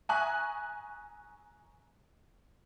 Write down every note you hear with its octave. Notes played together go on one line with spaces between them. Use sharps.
E5 G#5 A#5 C#6 D#6 F#6